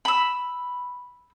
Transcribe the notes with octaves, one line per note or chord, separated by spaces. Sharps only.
B5 E6